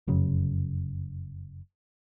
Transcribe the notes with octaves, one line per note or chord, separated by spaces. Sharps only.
F1 F#2 C#3